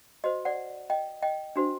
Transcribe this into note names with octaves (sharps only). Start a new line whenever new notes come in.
F#4 C5 D#5
D5 F#5
D#5 G5
D#5 G5
D4 F#4 C5